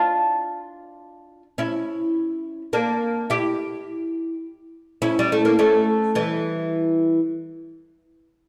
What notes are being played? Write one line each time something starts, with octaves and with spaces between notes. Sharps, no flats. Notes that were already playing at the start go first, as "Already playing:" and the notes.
Already playing: D4 F4
C#4 E4
A#3 D4
E4 G4
C#4 E4
G3
A3
A#3
A3 C#4
E3 G3